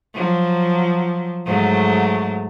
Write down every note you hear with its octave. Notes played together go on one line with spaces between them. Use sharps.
F3 F#3
G#2 F#3 A3